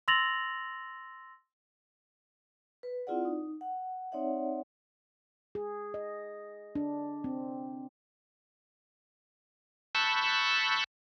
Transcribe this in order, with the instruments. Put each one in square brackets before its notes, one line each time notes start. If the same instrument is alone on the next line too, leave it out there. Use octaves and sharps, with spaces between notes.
[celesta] C6 E6 A6 A#6 F7 F#7
[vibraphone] B4
C4 E4 F4 G#4 D5 F#5
D#4
F#5
C4 D#4 C#5 D5 E5 F#5
[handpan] G#4
D#5
D4
C4
[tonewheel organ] A5 B5 C#6 E6 F#6 G6